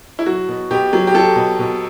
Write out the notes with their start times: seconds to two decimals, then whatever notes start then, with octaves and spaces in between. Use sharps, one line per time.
0.19 E4
0.26 F#3 F#4
0.48 B2
0.71 B2 G4
0.93 F#3
1.07 G4
1.14 F#3 A4
1.36 B2
1.59 B2